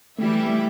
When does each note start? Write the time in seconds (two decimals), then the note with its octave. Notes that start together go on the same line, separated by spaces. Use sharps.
0.18 E3 G3 A3 E4 G4 E5
0.47 A3